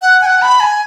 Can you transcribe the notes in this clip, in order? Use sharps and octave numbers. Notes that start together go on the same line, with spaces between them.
F#5
G#5
F#5
B5
G#5